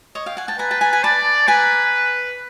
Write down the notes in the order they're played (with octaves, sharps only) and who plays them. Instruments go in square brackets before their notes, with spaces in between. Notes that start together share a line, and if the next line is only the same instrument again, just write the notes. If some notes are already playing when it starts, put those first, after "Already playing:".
[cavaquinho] C#5 D#5
F5 G5
F#5 G#5
G5 A5
[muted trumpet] B4 [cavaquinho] G#5 A#5
[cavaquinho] G5 A5
G#5 A#5
G#5 A#5
[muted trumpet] D5 [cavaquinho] A5 B5
[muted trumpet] B4 [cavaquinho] G#5 A#5